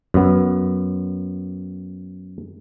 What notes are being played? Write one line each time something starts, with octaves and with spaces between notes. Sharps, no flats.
F#2 B3